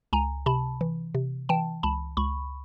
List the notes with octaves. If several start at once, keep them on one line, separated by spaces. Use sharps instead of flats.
C#2 G#5 A#5
C3 A5 B5
E3
C3
E3 G5 A5
C#2 A5 B5
C#2 B5 C#6